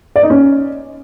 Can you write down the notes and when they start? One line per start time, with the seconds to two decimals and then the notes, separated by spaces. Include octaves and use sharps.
0.16 D5
0.23 D#4
0.30 C#4